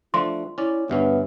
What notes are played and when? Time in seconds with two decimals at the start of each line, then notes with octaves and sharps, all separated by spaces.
0.14 F3 A3 D4 F4 C6
0.58 C#4 E4 D5
0.90 D2 G2 B3 C#4 E5